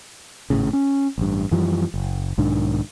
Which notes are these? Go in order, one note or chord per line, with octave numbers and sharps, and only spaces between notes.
G#1 A2 C#3
C#4
A1 G2
F#2 E3 F3 G3
F#1
B1 G#2 D#3 D4